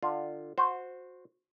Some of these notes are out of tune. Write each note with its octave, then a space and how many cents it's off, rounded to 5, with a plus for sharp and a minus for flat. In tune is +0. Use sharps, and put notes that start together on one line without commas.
D3 +25 F4 +0
F#4 -20 C5 +0